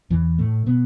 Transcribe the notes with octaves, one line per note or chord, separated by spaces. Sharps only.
E2 E3
A2 A3
B2 B3